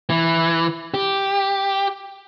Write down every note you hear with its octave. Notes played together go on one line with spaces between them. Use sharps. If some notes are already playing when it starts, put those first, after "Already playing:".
E3
G4